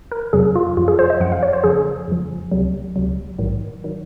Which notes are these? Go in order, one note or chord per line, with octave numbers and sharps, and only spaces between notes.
A#4
F2 C3 F#3 G#4
F4
F#2 F3 F4
G#4
C5
D#5
F#2 F3 F#5
F5
C#5
C5
F2 C#3 F3 G#4
F2 C#3 F3
C#2 C3 F#3
C#2 C3 F#3
A#1 G#2 D#3 F#3
D#3 F#3